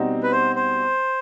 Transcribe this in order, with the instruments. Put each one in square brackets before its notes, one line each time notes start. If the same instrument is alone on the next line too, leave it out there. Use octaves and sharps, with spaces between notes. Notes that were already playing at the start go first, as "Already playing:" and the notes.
Already playing: [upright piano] B2 G3 C4 D#4 F#4
[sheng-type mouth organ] B4
C5
C5